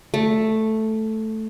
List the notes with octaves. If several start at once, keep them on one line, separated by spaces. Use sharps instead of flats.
A3